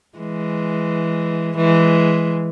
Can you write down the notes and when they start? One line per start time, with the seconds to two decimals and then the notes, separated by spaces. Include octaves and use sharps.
0.18 E3 G#3
1.57 E3 G#3